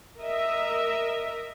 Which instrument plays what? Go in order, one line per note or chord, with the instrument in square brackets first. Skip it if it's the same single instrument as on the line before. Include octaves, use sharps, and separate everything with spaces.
[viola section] A#4 D#5 E5